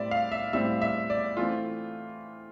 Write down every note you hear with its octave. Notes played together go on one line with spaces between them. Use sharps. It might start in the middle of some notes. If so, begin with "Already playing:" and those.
Already playing: A2 G3 C4 D5 E5
F5
E5
A2 G3 C4 E5
E5
D5
E3 A3 C4 F4